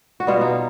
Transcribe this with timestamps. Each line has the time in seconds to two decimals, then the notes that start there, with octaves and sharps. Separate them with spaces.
0.20 F#4
0.27 B2 G3 B3 F4
0.41 D#4